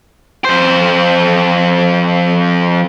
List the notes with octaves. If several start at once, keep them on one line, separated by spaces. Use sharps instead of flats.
F2 C5